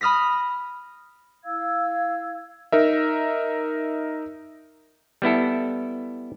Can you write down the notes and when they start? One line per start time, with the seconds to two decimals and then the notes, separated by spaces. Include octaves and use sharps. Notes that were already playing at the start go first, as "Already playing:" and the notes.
0.01 B5 D#6 F6 A#6 B6
1.45 E4 F5 E6 G#6
2.72 D#4 A#4 E5
5.22 G3 B3 E4 A4